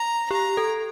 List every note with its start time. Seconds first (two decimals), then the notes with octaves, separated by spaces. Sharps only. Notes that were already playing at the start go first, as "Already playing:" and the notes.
Already playing: A#5
0.31 G4 A#5
0.57 A4